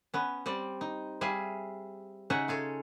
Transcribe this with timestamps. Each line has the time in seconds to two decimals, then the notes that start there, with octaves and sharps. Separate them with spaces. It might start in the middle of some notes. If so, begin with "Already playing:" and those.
0.14 B3 C#4
0.46 G3 C4 D5
0.81 D#4
1.21 G3 G#4 E5 F5
2.30 C#3 C#4 D#4 E5 F#5
2.48 F4 G#4 A4 C#5